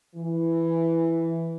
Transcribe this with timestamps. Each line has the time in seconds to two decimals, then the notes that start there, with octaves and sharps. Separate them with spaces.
0.16 E3